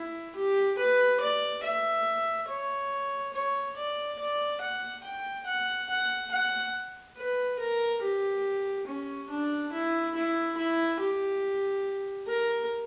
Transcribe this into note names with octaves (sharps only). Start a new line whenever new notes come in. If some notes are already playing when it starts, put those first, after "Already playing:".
Already playing: E4
G4
B4
D5
E5
C#5
C#5
D5
D5
F#5
G5
F#5
F#5
F#5
B4
A#4
G4
C#4
D4
E4
E4
E4
G4
A#4